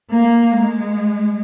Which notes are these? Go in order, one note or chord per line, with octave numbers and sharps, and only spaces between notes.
A#3
G#3